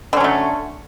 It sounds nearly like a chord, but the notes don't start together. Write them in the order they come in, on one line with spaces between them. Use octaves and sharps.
D3 C#4 F#3 A3